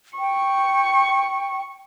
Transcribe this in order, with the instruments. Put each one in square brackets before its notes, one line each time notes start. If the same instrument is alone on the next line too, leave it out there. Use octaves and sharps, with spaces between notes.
[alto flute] G5 [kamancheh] C#6